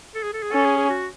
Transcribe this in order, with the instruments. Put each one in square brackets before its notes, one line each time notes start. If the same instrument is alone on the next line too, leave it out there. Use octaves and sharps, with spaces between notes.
[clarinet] A4
G#4
A4
G#4
[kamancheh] C#4 [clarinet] A4
[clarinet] G#4
G#4
F#4